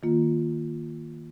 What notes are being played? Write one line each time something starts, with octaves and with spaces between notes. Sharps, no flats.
D#3 A#3 F4